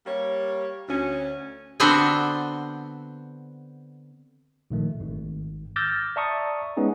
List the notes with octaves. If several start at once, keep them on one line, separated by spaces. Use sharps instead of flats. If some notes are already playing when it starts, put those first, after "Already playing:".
G3 A#3 C#5
D2 C#4
D3 B3 C4 D4 F#4 C5
A#1 D#3 A3
G#1
D6 E6 F6 G6 A6 A#6
D5 E5 A5 A#5 C#6 D#6
G#3 B3 C#4 D#4 G#4